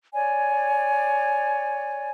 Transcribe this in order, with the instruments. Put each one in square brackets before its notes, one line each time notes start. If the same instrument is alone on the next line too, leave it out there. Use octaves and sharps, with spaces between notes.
[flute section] C#5 D5 G#5